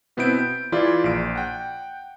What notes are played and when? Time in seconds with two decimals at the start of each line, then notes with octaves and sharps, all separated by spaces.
0.17 B2 B3 C4 E4 G6 D7
0.39 G6
0.72 E3 E4 F4 G#4 D5
1.04 A#1 D7
1.35 F#5 G5